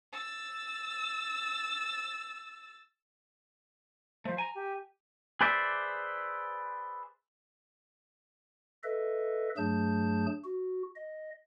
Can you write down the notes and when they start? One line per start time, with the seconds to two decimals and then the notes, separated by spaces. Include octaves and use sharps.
0.13 E6 A6
4.25 F3 A3 C5
4.38 G#5 A#5
4.55 G4
5.41 G#4 B4 C5 D5 E5
8.83 A4 B4 D#5 E5
9.57 G2 F#3 A3 G#4 A5 G6
10.44 F#4
10.96 D#5